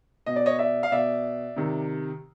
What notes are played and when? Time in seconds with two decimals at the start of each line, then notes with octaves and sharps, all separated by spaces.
0.26 B2 D#5
0.36 D5
0.46 C#5 D#5
0.59 D5 E5
0.83 F5
0.92 B2 D5 E5
1.56 C3 D#3